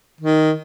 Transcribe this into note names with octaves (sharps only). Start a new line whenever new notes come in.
D#3